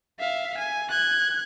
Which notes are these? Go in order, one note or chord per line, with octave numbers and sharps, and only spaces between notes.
E5 F5
G#5
F#6 G#6